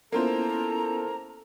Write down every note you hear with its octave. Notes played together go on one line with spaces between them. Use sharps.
A#3 B3 C#4 E4 F4 A4 C5 A#5